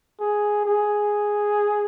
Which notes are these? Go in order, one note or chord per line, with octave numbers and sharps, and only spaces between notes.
G#4
G#4